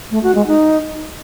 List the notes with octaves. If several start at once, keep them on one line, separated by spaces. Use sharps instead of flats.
A3
F#4
G#3
D#4